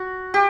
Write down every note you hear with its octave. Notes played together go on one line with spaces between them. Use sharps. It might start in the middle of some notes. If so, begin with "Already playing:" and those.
Already playing: F#4
G4